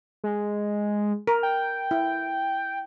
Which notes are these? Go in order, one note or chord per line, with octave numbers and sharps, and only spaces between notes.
G#3
A#4
G5
E4